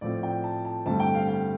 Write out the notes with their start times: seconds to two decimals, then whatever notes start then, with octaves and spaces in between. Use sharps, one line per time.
0.01 A2 F3 C4 D5
0.23 G5
0.44 A5
0.65 A5
0.86 G2 D3 A3 C4 A5
1.00 G5
1.14 F5
1.29 G5